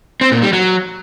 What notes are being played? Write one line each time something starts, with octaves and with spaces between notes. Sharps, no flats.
C4
A#2
G3
F#3